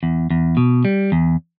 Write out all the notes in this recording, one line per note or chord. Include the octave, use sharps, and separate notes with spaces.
E2
E2
B2
G3
E2